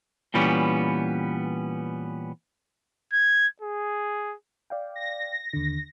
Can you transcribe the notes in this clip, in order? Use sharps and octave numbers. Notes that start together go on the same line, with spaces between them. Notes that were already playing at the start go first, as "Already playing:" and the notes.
A#2 E3 G3 B3 C#4
G#6
G#4
D5 F5 G5
A#6
D#2 D3